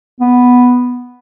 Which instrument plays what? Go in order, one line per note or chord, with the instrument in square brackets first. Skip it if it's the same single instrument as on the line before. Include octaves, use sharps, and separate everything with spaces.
[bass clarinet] B3